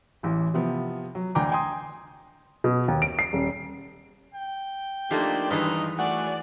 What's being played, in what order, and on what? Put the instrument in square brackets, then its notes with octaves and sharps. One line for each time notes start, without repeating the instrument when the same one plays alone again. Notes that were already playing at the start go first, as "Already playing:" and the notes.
[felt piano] A1 E3
C3 F3 B3
F#3
D2 D4 G5 G#5 A#5 D6
G5 G#5 A#5 C6 D#6
[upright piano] B2
D#2
D7
C7
D#1
[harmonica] G5
[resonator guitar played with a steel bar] F3 A3 A#3 [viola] D4 C5 [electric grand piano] D#4 G4
[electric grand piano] G2 D#3 [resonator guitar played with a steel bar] E3 G#3 B4 [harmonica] D#4 D#5
[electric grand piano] A3 F#5 [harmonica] F#4 G#5 [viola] D5